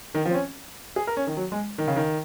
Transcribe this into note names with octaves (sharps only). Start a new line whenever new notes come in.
D#3
F3
C4
C#4
G#4
A#4
C#4
D#3
F#3
G#3
D#3
C#3
D#3